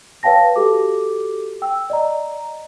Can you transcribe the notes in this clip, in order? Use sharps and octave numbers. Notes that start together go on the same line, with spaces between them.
B4 C#5 F5 G5 A5 A#6
F#4 G4 A4 D6
G5 E6
D5 D#5 A#5